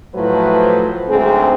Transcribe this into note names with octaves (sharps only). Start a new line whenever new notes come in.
A2 F3 F#3 A3 B4 C5
D2 G#2 C4 G#4